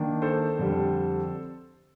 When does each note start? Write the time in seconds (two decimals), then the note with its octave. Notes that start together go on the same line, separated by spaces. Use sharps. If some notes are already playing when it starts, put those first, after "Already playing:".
Already playing: D#3 A#3 D4
0.22 A4 C5
0.59 F2 D3 G3